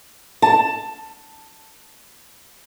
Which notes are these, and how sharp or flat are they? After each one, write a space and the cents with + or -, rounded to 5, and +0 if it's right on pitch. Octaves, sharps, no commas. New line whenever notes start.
A5 +10